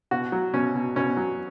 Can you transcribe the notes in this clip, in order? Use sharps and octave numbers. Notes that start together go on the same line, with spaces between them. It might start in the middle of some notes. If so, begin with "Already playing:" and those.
B2 F#4
F#3
B2 C#4
B2
B2 C#4
F#3